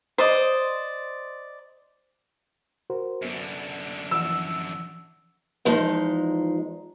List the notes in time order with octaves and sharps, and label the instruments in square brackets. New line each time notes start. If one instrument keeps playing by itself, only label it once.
[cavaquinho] C5 D5 D#5
[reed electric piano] F#4 A#4 C5
[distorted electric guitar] F#2 D3 [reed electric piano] F#3 B3
[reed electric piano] E3 F3 F#5 [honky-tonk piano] E6
[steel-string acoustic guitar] E2 F3 G#3 D#4